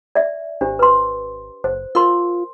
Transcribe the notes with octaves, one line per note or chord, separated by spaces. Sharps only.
D5 E5
G#1 D4 G4 C5
B4 C6
F#1 C5
F4 A#4 C6